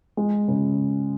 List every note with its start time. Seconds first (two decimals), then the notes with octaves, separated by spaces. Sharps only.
0.17 G#3
0.48 C#3